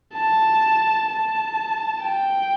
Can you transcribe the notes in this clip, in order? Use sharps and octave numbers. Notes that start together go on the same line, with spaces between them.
A5
A5
G5